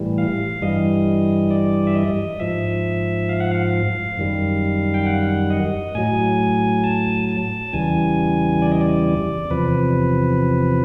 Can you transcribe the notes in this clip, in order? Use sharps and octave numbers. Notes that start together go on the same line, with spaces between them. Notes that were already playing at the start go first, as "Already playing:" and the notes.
Already playing: A2 E3 G3
F5
G2 E3 G3 D#5
D5
E5
D#5
G#2 F3 E5
F5
F#5
F5
F#2 D#3 G3
G5
F#5
D#5
A2 F#3 G#5
A5
A5
E2 C#3 E3 G3 G#5
D5
D#5
D5
E2 C3 F3 B4